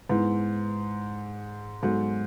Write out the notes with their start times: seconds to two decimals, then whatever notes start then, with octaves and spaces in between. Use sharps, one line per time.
0.09 G#2 B3 E4 B4
1.83 G#2 F#3 B3 F#4 A4